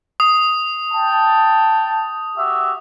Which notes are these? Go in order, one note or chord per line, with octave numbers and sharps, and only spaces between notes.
D#6
G5 A5
F#4 G4 E5